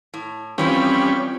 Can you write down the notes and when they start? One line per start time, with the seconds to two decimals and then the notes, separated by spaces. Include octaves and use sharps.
0.14 A2
0.58 E3 F3 G3 C4 C#4 F4 B5